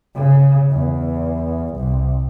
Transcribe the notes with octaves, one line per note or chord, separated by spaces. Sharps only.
C#3
E2
C2